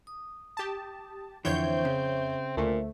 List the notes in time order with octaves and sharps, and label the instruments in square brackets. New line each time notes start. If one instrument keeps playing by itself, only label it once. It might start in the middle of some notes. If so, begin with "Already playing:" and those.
[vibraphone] D#6
[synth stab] G4 A5
[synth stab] F2 C#5 G6 [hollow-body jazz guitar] D3 E3 [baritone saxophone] C4 [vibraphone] C5 E5
[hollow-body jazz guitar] C#3
[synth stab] D2 A3 [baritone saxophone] A#2